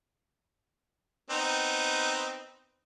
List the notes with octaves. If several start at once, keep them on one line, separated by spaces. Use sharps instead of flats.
B3 C4 D#4